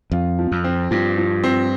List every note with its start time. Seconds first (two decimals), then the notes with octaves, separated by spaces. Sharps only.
0.12 F2 F4
0.39 F3
0.52 F2
0.64 C4
0.91 G2 F3
1.18 F3
1.44 C4